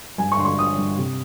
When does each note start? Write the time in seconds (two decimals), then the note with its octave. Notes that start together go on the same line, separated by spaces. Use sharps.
0.18 G2 G#5
0.32 C#6
0.38 D3 C6
0.45 C#6
0.58 D3 D#6
0.78 G2
0.98 C3